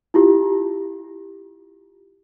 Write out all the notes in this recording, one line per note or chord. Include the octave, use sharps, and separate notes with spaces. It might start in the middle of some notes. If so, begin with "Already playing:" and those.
E4 F4 G4